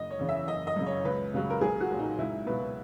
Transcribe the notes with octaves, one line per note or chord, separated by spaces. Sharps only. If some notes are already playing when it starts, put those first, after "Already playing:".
Already playing: F#1 D#5
C#5
E2 C#3 E3
E5
F#1 D#5
D#5
F#2 C#3
C#5
C#2 B4
C#3 F#3
A#4
B1 G#4
F#4
A#2 F#3
D#4
C#2 E4
B2 F#3 B4